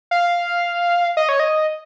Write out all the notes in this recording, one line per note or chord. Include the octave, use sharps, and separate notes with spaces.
F5
D#5
C#5
D#5